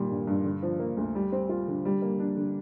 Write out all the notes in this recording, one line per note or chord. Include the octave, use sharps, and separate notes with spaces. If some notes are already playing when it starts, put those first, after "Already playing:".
Already playing: A#2 D#3 G3
G2
G2
D3
F3
A#3
D2
G3
C4
F4
D3
G3
A#3
D4
D3